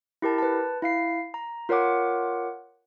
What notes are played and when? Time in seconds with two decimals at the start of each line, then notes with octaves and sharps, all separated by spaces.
0.22 E4 G4 A#4 A5
0.38 B4 A5
0.82 E4 F5 C7
1.34 A#5
1.69 F4 A#4 C#5 F#5 D6